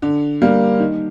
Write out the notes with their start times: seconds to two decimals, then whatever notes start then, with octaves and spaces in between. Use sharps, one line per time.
0.02 D3
0.42 G3 A#3
0.80 D#3